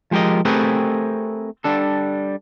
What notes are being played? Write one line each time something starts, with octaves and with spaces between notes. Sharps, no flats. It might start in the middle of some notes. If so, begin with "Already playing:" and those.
F3 G#3 G4 A#4 D#5
A3 C4 G4 G#4 A#4 B4
G3 D4 A4